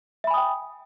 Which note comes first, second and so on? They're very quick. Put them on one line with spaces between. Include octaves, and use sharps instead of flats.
E5 B5 G#5 D#6 G5